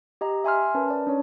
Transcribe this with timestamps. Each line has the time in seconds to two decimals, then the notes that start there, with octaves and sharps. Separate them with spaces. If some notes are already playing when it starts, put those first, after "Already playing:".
0.21 G4 D#5 A#5
0.44 E5 G#5 C6 F6
0.75 C#4 A#4 B4 A5
0.88 D5 A5
1.07 C#4 D4 C#5